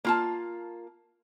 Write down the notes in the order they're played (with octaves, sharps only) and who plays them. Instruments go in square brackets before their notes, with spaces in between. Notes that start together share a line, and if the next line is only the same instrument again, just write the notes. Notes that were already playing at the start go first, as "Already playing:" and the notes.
[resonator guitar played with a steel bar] A#3 F4 A5